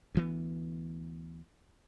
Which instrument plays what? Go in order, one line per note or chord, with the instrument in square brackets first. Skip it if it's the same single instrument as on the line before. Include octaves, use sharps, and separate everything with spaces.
[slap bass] D2 E3 B3